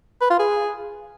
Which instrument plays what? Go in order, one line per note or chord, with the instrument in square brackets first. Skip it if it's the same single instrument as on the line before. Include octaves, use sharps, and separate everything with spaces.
[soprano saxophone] B4
F4
G#4